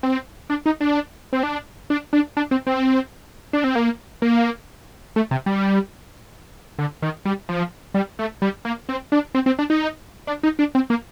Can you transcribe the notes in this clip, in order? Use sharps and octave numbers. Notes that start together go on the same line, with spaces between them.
C4
D4
D#4
D4
C4
D4
D4
D4
D4
C4
C4
D4
C4
A#3
A#3
A3
C3
G3
D3
D#3
G3
F3
G3
A3
G3
A#3
C4
D4
C4
C4
D4
D#4
D4
D#4
D4
C4
A#3